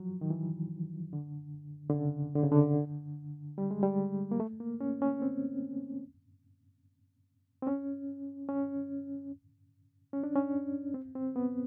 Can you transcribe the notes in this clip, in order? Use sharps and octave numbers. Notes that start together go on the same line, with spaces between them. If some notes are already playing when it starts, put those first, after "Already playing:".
Already playing: F3 F#3
D#3
E3
D3
D3
C#3
D3
C#3
D3
G3
G#3
G3
A#3
A3
A#3
C#4
C#4
C4
C4
C#4
C#4
C#4
D4
C#4
C4
C4
B3